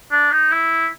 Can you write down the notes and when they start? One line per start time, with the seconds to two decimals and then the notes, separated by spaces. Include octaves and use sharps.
0.12 D4
0.31 D#4
0.51 E4